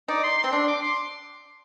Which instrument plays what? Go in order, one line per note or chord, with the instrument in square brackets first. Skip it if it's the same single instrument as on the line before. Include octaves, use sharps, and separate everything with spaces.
[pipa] D#4 [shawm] D5
[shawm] C6
C6
[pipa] C4
[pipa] D4 [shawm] C6
[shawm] D6
C6